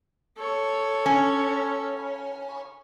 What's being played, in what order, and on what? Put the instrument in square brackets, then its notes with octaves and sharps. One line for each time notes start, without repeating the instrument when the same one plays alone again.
[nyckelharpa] A4 C#5
[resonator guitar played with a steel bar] C#4